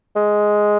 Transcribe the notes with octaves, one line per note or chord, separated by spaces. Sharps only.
G#3